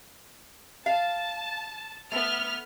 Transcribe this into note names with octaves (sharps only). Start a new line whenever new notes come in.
F5 A5
A3 B3 F6